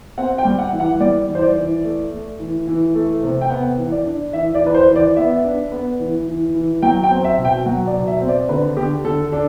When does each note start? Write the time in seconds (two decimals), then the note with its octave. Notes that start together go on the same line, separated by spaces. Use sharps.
0.18 C4 F#5
0.38 G5
0.45 G3
0.58 F#5
0.73 E3
0.80 F#5
1.00 G3 D5
1.29 E3
1.35 C5
1.42 D5
1.56 E3
1.84 A3
2.12 A3
2.39 E3
2.67 E3
2.95 A3
3.23 C3
3.41 G5
3.50 B3 F#5
3.78 E3
3.92 D5
4.05 D4
4.33 E3 E5
4.55 D5
4.61 E3
4.66 B4
4.74 C5
4.89 E3
4.96 D5
5.16 B3 E5
5.44 D4
5.72 B3
5.99 E3
6.27 E3
6.54 E3
6.82 F#3 G5
7.04 G5
7.10 C4
7.24 E5
7.38 B2
7.45 G5
7.66 F#3 F#5
7.87 D5
7.94 B2
8.07 E5
8.21 C4
8.28 D5
8.49 D3 B4
8.77 D3 G4
9.04 D3 A4
9.32 D4 A4